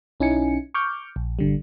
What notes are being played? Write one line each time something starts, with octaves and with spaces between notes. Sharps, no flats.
B1 C#4 D#4 E4 G#5 C#7
C#6 D6 F6 G6
A#1
G#1 D3 G3